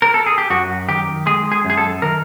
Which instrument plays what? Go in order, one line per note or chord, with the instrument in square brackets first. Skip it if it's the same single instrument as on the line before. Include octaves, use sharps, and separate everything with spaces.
[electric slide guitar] A#4
A4
G#4
G4
F#2 F#4
D#3 G4
G#3 G#4
G#4
F#2
G#4
A4
D#3 A#4